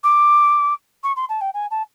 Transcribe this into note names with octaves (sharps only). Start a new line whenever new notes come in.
D6
C#6
C6
A5
G5
G#5
A5